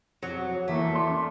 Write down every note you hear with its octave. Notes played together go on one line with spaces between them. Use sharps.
F2 F#3
E2 E3 A3 A#3
D5 C6
C#4